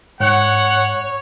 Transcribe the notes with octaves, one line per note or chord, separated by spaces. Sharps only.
G#2 C#5 F#5